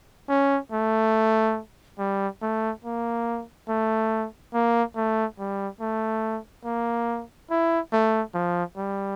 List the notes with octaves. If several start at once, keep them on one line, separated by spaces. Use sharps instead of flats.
C#4
A3
G3
A3
A#3
A3
A#3
A3
G3
A3
A#3
E4
A3
F3
G3